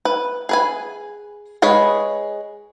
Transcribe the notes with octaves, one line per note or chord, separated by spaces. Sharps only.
B4
G#4 B4 G#5
G#3 G#4 B4 C#5 B5